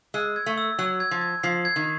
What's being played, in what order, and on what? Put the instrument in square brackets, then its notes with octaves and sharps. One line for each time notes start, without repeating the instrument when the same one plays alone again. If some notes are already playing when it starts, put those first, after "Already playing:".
[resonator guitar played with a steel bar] G#3 [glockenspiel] E6
[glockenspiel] G#6
[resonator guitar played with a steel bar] A3
[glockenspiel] E6
[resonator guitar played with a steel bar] F#3 [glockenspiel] E6
[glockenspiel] G#6
[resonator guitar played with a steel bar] F3
[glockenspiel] G#6
[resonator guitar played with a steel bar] F3 [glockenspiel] C7
[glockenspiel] G#6
[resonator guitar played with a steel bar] D#3